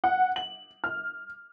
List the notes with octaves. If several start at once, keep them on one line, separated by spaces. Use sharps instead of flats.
F#5
F#7
F6